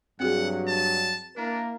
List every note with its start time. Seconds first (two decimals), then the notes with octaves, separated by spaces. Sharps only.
0.20 G2 F#3 C4 F#4 G#4 F#5
0.67 A5
1.37 A#3 D4 E4 A#4